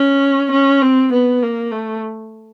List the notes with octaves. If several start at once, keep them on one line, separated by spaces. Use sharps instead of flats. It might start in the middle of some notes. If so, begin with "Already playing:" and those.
Already playing: C#4
C#4
C4
B3
A#3
A3